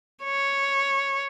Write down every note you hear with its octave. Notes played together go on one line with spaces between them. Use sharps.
C#5